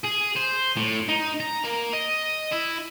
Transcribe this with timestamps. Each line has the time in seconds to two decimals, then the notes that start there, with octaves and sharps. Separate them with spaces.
0.05 G#4
0.36 C5
0.77 A2
1.08 D#4
1.40 A#5
1.64 A#3
1.93 D#5
2.52 E4